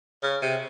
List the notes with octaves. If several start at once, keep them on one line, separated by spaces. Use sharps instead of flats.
C#3
C3